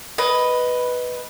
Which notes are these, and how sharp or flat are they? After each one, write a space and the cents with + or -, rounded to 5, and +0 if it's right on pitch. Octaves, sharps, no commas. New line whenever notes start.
B4 +0 D#5 +5